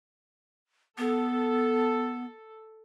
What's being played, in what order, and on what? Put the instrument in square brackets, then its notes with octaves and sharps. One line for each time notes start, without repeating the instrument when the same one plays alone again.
[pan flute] B3 [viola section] A4